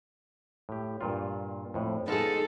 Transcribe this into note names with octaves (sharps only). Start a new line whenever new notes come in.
A2 G4
G2 A#2 F4
F2 A2
B3 D#4 F4 G#4 A4